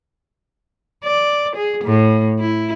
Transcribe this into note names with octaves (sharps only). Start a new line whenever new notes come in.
D5
G#4
A2
E4